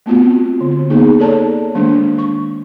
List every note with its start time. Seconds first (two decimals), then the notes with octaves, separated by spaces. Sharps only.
0.06 A3 B3 C4 F4 F#4
0.61 D3
0.90 A#3 B3 D#4 G#4
1.20 A4 C#5 D5 A5 A#5
1.75 D#3 G#3 A#3 D4
2.18 C#6